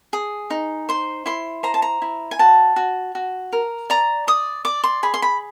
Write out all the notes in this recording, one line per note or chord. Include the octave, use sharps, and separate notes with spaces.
G#4
D#4
C5 C6
E4 C6
C5 A#5
A5
A#5
E4
G#5
F#4 A5
F#4
F#4
A#4
D5 A#5
D5 D#6
D5 D6
C6
G#4 B5
C6
B5